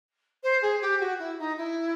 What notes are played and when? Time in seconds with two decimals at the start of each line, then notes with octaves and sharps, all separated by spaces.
0.43 C5
0.62 G#4
0.82 G4
1.00 F#4
1.19 E4
1.39 D#4
1.58 E4